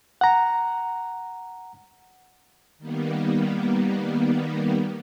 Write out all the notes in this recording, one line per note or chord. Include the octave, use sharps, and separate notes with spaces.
F#5 A#5
D#3 G3 A#3 B3